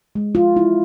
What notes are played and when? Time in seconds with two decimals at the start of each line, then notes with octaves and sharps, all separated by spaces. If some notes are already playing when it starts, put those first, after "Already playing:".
0.15 G#3
0.35 F4
0.56 E4